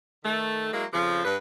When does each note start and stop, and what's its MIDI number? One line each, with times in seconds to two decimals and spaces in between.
0.24 0.72 51
0.24 0.72 57
0.73 0.85 54
0.73 0.85 56
0.73 0.85 58
0.73 0.85 64
0.93 1.22 41
0.93 1.22 49
0.93 1.22 53
1.25 1.37 43
1.25 1.37 71